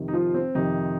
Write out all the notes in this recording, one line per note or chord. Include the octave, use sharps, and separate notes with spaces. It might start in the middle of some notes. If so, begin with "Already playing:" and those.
Already playing: F2 C3 D#3
D#4
F3 F4
C4
F2 C3 D#3 D#4